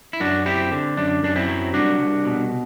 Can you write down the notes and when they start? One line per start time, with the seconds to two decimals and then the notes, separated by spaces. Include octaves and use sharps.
0.13 E4
0.20 F#2 D4 F#4
0.46 C4 E4 G4
0.72 D3
0.97 F#2 D4
1.23 F#2 D4
1.36 C4 E4
1.48 F#3
1.74 C2 D4 F#4
2.00 C2
2.25 B2